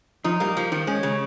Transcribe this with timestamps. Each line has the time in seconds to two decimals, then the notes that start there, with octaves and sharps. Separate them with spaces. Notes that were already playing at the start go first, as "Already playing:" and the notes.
0.24 F3 D#4
0.40 G3 A#3
0.57 F3
0.72 D#3 F3
0.87 G#3 C#4
1.03 C#3 G#3